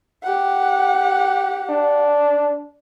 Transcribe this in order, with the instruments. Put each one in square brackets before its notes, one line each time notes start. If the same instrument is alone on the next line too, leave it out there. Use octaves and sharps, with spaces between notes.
[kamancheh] G4 F#5
[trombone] D4